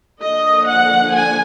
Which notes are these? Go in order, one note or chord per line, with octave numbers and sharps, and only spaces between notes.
D3 F3 A#3 D4 D#5
F#5
G#5